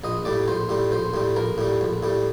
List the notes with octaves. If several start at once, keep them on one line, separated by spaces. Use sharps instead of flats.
A#1 D#5
A2 G3 D5
A#1 C5
A2 G3
A#1 C5
A2 G3
A#1 A#4
A2 G3
A#1
A2 G3